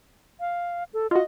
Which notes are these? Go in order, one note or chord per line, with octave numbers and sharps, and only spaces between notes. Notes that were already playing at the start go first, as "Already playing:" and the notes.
F5
A4
F4 F#4 D#5